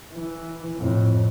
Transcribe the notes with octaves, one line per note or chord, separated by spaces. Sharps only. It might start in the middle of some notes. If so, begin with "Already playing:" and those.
E3
F2 A2